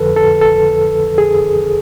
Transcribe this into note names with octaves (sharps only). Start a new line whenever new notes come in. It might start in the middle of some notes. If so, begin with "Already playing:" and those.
Already playing: F2 D3 F3 A4 B4
A4
A4
G#4